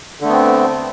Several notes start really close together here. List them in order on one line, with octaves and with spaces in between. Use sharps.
D3 A3 B3 C4